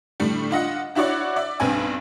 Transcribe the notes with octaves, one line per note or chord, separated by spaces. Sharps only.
A2 D3 G3 A3
D4 F4 D#5 F#5
D4 E4 F#4 C#5 D5 F#5
D5 E5
B1 G2 B3 C4 G#5